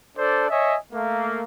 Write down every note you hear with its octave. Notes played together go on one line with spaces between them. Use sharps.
D4 A4 C5 D5
C#5 D#5 E5 G#5
A3 A#3